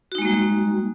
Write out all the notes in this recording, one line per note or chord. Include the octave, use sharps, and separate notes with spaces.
G3 G#3 A#3 D#4 F#4